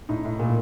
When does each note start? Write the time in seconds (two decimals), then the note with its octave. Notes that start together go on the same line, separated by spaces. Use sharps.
0.09 A2 D#4
0.25 A2
0.39 A#2